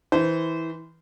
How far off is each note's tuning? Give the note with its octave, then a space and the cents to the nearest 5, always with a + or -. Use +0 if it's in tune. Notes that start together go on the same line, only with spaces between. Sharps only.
E3 -20 C5 -25